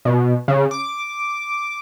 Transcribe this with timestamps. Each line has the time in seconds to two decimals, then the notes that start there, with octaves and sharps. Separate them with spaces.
0.05 B2
0.48 C#3
0.71 D6